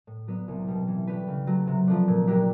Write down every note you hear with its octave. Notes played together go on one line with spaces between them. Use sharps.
A2
F#3 B3 D4
C2
B2 G3
E3
A3 D4 G4 B4
C#3
F#3 A3
C3
F3 A3 D4
A#2
F#3 A#3 D4 G4